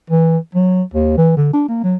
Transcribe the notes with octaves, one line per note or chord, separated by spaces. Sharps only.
E3
F#3
D#2
E3
D3
D4
A#3
F#3